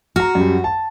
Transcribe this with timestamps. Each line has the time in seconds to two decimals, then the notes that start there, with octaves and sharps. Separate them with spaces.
0.16 F#4 A#5 F6
0.35 F#2 G3
0.64 A5